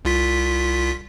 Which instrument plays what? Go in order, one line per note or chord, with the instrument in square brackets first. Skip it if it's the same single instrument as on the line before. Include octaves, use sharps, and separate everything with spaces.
[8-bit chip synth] C2 F4 B6